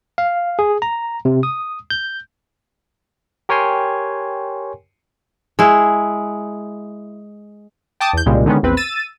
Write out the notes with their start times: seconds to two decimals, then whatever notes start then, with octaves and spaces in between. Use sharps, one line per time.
0.18 F5
0.59 G#4
0.82 A#5
1.25 C3
1.43 D#6
1.90 G6
3.49 G4 A#4 C#5 G5 G#5 C6
5.59 G#3 E4
8.01 G5 A5 D6 D#6
8.13 E2 G6
8.26 C2 A#2 C#3 G3 G#3 A#3
8.46 D3 D#3 G#3 B3 C#4
8.63 A#1 E2 C4 B4
8.77 E6 A6 D#7